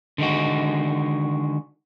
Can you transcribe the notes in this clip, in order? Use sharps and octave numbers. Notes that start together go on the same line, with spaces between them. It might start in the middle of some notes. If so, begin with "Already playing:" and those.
D3 D#3 G#3 F#4